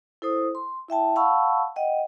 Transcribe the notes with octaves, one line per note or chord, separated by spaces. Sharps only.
E4 A4 C5 D#6
C6
E4 E5 G5 A5
F5 F#5 A5 B5 C#6 E6
D#5 F#5 G5